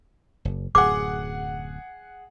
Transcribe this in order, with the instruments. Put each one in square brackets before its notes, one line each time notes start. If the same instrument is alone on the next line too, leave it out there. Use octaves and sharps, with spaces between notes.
[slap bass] F#1
[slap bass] D1 F#2 [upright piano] G#4 F#5 [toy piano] D6